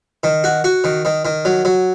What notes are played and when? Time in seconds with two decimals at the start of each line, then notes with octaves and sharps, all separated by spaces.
0.23 D#3
0.44 F#4
0.64 F#4
0.84 D#3
1.05 D#3
1.25 D#3
1.45 F#3
1.65 F#3